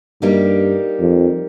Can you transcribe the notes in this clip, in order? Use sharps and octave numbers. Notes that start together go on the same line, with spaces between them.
G2 G3 A#3 D#4 G4
F2